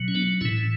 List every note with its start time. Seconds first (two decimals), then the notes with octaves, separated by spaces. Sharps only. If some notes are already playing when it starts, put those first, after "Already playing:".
Already playing: B2 F#3
0.08 C#4
0.15 B3 D4
0.41 A2 C#4 E4
0.45 E3